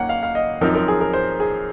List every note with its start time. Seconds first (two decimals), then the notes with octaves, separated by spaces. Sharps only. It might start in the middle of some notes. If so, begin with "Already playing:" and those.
Already playing: D#3 F#3 A#3 C#4 F#5
0.09 F5
0.23 F5
0.35 D#5
0.61 F#2 F3 C4 D#4 A#4
0.75 A#4
0.88 G#4
1.01 A#4
1.13 C5
1.40 G#4